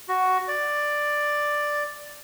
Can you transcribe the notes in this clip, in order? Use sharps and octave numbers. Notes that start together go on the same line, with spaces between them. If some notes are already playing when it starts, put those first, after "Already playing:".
F#4
D5